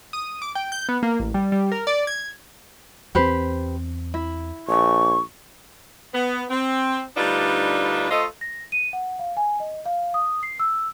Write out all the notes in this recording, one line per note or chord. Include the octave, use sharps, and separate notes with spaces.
D#6
D6
G5
G6
B3
A#3
A1
G3
G3
A#4
D5
G#6
E2 C4 G4 B4 C5
E4
A#1 C#6
B3
C4
D2 G3 D4 D#4 F4 B4
A3 F4 A4 C5 D#5
A#6
D#7
F#5
F5
G#5
D#5
F5
D#6
C7
E6